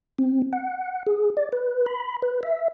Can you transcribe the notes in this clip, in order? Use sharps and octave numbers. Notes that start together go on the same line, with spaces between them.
C4
F#5
G#4
D5
B4
B5
B4
E5